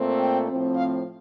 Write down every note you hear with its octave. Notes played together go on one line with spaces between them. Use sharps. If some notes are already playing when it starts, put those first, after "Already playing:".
Already playing: A#2 A3 C4
G5
A2 F3 C4
F5